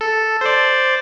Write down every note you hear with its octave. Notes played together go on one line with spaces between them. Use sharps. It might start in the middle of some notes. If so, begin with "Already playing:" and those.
A4
C5 D5